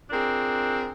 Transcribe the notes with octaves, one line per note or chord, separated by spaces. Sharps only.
C4 D4 F4 G#4 A#4